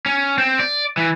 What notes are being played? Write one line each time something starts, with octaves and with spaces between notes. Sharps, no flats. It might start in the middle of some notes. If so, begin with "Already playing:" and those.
C#4
C4
D5
E3